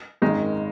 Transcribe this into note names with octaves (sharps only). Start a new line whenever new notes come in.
G#1 F#2 D#3 G#3 D#4